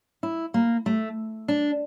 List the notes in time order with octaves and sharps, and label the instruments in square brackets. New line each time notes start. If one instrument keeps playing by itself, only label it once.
[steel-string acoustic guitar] E4
A#3
A3
D4